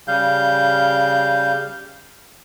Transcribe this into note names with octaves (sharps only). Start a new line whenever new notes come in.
C#3 G3 F5 G6